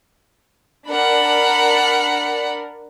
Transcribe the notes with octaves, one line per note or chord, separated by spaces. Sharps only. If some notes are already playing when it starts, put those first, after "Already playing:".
D4 A#4 F#5 B5